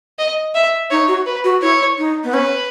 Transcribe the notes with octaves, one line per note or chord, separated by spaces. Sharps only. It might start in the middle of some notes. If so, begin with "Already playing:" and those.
D#5
E5
D#4 C#5
F#4
B4
F#4
E4 C#5
D#4
B3
C#4 B4